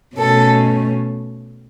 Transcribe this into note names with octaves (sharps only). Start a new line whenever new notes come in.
B2 A3 C#4 A4